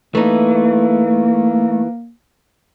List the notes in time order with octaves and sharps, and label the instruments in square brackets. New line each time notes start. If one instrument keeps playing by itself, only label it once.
[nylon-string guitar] E3 D#4 [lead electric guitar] A3 [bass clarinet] A#3